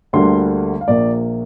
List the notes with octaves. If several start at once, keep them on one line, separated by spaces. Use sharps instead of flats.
D2 D3 G3 A#3 C6
F5
A#1 A#2 A#3 D5